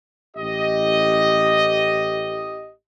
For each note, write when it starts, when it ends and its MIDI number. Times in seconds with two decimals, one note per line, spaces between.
0.37 2.72 33
0.37 2.72 67
0.37 2.72 75